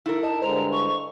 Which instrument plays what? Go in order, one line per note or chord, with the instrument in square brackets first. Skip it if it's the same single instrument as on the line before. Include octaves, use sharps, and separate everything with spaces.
[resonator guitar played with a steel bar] E4 A4 A#4
[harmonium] D#4 [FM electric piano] D#5 [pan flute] A5
[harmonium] G2 D3 G#3 [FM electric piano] C5 [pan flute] A#5
[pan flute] C#6